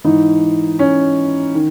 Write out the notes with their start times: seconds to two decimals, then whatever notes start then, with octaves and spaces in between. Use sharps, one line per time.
0.04 G#2 E3 D#4
0.79 C#4
1.55 D#3